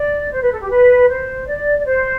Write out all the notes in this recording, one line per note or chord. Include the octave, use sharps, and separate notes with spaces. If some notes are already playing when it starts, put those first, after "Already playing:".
Already playing: D5
C5
B4
A4
G4
B4
C5
D5
D5
C5